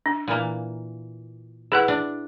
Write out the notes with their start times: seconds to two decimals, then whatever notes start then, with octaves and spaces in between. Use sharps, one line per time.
0.06 D4
0.28 A#2 E3 A#3
1.72 E4 G#4 B4 F#5
1.88 D4